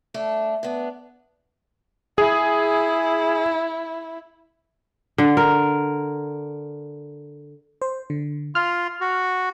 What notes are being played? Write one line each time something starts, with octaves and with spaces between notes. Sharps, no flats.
A3 D4 A4
B3 D4
E4 G#4
D3
A#4
C5
D3
F4 F6
F#4